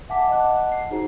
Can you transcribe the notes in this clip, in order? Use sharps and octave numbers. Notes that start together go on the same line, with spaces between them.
E5 F#5 G#5 A5 D6 B6
D#5 F5 F#5 A5 D6 F#6
C7
D#4 F#4 G#4 C5 A#5 C7